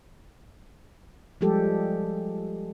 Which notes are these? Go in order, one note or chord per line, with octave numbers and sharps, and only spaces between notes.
F3 G3 G#3 G4 A4